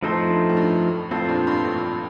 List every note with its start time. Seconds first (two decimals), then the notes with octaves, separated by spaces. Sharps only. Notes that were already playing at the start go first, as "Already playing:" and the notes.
0.03 F2 A2 F3 A3 D#4 A4 C5
0.30 G2
0.49 A2
0.57 G2
1.11 F2 A2 C4 F4 A4 C5
1.28 G2 A#2
1.47 G2
1.64 F2 A2